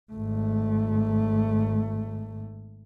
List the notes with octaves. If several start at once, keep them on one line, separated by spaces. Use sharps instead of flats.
G#1 A3